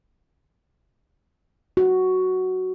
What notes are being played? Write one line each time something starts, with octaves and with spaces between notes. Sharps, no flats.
F#4